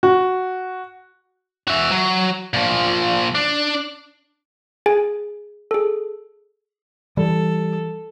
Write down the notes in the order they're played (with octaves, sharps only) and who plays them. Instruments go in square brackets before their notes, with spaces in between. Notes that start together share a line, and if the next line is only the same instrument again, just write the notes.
[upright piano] F#4
[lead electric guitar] F#4 E5
F#3
A#2 F3
D4
[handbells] G#4 G#5
G#4 A4
[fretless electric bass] E3 [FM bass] G3 [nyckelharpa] A4